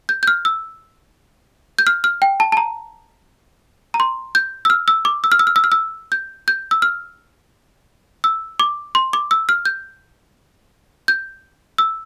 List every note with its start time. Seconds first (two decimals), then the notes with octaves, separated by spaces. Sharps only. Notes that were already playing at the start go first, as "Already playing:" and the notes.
0.09 G6
0.23 G6
0.27 F6
0.45 E6
1.79 G6
1.87 F6
2.04 F6
2.22 G5
2.40 A5
2.52 A5
2.57 A#5
3.94 A#5
4.00 C6
4.35 G6
4.65 E6
4.70 F6
4.88 E6
5.05 D6
5.24 E6
5.32 F6
5.39 E6
5.47 F6
5.56 E6
5.64 F6
5.72 E6
6.12 G6
6.48 G6
6.71 E6
6.82 F6
8.24 E6
8.60 D6
8.95 C6
9.13 D6
9.31 E6
9.49 F6
9.65 G6
11.08 G6
11.78 E6